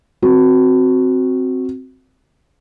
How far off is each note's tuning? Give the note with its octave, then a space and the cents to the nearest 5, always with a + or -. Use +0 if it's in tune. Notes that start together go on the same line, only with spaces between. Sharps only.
C4 +0 F#4 +0